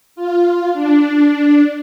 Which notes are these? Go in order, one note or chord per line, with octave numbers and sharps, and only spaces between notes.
F4
D4